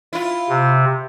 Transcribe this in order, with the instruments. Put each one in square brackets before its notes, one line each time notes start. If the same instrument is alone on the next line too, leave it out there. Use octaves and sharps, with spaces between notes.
[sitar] E4 F4
[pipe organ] C3